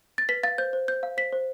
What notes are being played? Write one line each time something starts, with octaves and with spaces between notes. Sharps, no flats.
A6
B4 B6
F5 A6
C5 G6
C5
C5 G6
F5
C5 B6
C5